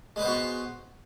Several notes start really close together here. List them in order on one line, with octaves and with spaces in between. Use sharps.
G#3 B4 C5 B3 F#4